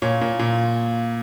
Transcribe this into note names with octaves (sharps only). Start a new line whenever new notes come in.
A#2 C#5
A#2
A#2